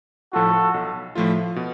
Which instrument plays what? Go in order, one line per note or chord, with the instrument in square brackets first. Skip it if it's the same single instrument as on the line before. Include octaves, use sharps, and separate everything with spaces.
[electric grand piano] A2 F3 A3 F4 [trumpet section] F#4 A4
[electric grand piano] B1
A2 F3 A3 F4
B2